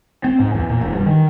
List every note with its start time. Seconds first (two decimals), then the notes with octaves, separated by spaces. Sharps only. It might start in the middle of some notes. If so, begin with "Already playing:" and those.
0.24 C4
0.40 G#2
0.54 E2
0.69 A#2
0.81 E1
0.93 G2
1.06 D#3